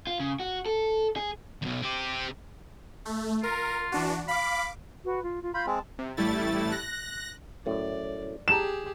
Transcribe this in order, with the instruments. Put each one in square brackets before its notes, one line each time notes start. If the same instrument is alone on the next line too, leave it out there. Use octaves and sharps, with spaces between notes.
[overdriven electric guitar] F4
C#3
F#4
A4
G#4
[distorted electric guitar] B1 E2
C4 G4
[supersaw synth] A3
[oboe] F4 [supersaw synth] A#4
[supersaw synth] E3 D4 F#4
[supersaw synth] F5 D6 [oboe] B5
[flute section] F#4 B4
F4
F4
[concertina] F4 B5 [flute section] C6 G6
[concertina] G#3 C4 [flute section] A5
[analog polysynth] C3
A1 G3 A3 E4 A6
F#6 A#6
[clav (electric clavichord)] F#2 A2 [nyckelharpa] D5
[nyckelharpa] G4 G#4 [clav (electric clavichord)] A5 A#5 [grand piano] E7